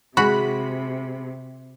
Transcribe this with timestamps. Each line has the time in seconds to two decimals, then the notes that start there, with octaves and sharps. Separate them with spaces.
0.17 C3 G#3 F#4 B5